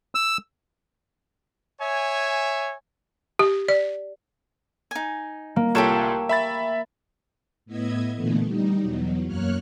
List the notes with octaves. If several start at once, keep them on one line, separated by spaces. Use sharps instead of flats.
E6
C#5 E5 G#5
G4
D5
D#4 G#5
A#3
C2 F4 G4 A4 C#5 E7
E5 B5 A6
A2 B3 E4 D#5 E5 G#6
A#2 D3 E3 A3 B3
G3 D#4
E2 B2 F#3
F#2 A#3 C#5 F6 F#6